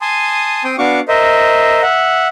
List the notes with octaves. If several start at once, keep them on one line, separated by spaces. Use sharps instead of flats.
G#5 A5 C6 D#6
C4 G5 C6 D#6
B3 D4 F#4 F5 C#6 D6
A#4 C5 D#5 E5
E5 F#5